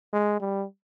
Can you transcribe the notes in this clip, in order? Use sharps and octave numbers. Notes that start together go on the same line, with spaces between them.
G#3
G3